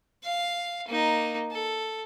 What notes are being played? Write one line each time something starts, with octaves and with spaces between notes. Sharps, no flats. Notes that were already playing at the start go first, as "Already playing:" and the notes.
F5
A#3 D#4
A4